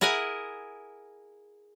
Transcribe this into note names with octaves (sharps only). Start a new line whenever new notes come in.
E4 G#4 A#4 F#5 G#5